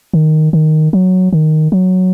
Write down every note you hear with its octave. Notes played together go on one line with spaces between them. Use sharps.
D#3
D#3
F#3
D#3
F#3